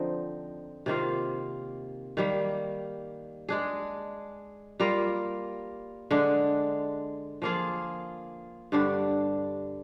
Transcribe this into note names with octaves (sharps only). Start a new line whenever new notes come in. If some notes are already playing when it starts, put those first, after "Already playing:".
Already playing: D3 F3 C4 D#4
C3 D#3 A#3 F4
D#3 G3 A#3
G#3 D4 G#4
G3 A#3 F4 A#4
D3 G#3 D4
F3 A#3 F4 G#4
G2 D3 G3 D4